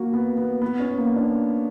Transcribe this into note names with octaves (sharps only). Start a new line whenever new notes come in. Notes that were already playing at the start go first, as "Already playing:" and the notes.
Already playing: A#3 F#4
B3
B3
B3
C#4
A#3
D4